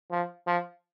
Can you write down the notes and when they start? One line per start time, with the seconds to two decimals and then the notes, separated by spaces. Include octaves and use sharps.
0.11 F3
0.47 F3